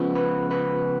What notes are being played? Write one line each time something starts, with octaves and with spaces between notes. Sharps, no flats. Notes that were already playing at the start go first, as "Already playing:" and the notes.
Already playing: C#2 C#3 F3 G#3 B3
B4
B4